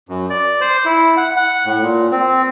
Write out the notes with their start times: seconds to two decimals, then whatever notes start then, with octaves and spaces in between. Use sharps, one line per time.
0.09 F#2
0.30 D5
0.61 C5
0.85 E4
1.17 F#5
1.36 F#5
1.65 A2
1.81 A#2
2.12 C4